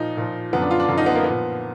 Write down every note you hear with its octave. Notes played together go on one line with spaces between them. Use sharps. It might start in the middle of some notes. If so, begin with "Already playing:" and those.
Already playing: A#2 F3 D#4
A#2 F3
F#2 D3 F3 B3
D4
F4
D4
F#2 D3 F3
D#4
B3
A#3
A#2 F3 B3